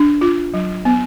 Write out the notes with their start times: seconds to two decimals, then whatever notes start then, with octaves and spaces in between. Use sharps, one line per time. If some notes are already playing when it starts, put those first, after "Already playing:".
Already playing: D4
0.21 F4
0.54 F#3
0.85 B3